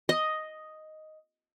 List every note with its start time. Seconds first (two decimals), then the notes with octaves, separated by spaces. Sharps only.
0.09 D#5